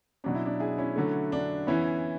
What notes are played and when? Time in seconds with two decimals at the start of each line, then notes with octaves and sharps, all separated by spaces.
0.24 B2 F#3 C#4 D4
0.35 E4
0.46 D4
0.60 E4 G#4
0.78 C#4 E4
0.96 D3 F#3 A3
1.32 D4
1.67 E3 B3 C#4 E4